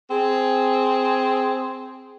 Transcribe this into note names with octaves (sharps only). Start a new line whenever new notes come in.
C4 G#4